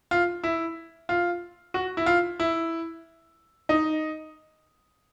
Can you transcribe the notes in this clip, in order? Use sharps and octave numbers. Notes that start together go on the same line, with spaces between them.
F4
E4
F4
F#4
E4
F4
E4
D#4